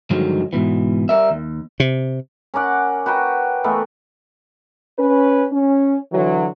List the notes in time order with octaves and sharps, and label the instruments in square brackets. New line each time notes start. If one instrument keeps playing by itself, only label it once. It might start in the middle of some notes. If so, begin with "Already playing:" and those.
[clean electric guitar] G2 D3 D#3 F3 F#3 G#3
G#2 B2 E3
G3 A#4 E5
D#2
[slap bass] C3
[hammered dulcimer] C#4 A#4 D5 F#5
F#4 B4 G5 A#5
E3 A3 B3 A#4
[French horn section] C#4 B4
C#4
D3 E3 F#3